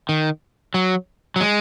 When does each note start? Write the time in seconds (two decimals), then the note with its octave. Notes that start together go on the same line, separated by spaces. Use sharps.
0.09 D#3
0.74 F#3
1.36 F#3
1.40 G#3